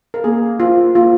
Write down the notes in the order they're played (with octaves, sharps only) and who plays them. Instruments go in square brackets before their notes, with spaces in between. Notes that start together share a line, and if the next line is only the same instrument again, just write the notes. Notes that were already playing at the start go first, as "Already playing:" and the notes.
[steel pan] A#4
[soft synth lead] A#3 [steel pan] G#4
[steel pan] F4
[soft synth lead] A#3 [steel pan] F4